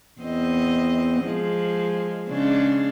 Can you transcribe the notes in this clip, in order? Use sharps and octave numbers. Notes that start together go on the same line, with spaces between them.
E2 C4 D#5
F3 G#3
C#3 G#3 D4